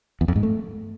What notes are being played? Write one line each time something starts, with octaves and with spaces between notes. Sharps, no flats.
E2
F2
G#2
A3